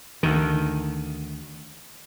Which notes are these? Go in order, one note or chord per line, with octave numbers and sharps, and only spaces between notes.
D2 D#3